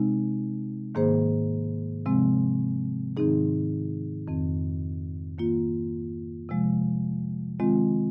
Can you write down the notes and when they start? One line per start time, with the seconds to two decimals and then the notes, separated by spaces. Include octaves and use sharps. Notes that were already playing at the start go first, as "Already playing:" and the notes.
Already playing: C3 G#3 C4 D#4
0.95 G#2 D#3 A#3 G#4 C5
2.06 C3 F3 G#3 C4
3.17 G#2 D#3 C4 D#4 G#4
4.28 F2 D#3 C4
5.38 D#3 A#3 F4
6.49 C3 F3 G#3
7.60 D#3 G#3 C4 F4